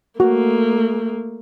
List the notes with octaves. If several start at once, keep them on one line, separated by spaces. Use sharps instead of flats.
A3 A#3 F#4